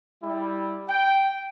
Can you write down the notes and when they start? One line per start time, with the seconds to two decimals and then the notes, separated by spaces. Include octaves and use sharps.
0.23 G3 E4
0.89 G5